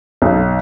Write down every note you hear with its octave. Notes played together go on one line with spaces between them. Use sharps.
B1